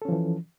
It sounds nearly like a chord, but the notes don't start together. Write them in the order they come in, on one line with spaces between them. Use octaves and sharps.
A4 C#4 F3 E3